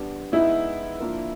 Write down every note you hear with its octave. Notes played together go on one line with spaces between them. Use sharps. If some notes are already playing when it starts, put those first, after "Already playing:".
Already playing: G3 B3 D4 G4
G#3 B3 D#4 E4
F3 A#3 D4 F4 A#4